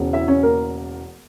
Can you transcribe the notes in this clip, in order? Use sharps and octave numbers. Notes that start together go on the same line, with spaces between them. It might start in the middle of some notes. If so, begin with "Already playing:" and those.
Already playing: E1 E2 C#3
E4 E5
C#4 C#5
A#3 A#4